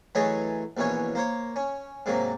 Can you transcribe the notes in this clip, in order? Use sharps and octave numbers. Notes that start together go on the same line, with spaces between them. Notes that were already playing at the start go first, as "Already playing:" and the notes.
E3 F#3 A3 G#4 C#5 D#5
A#1 B2 E3 C#4 C#5
A#3 C5 C#5
C#4
G#2 C3 F#3 A#3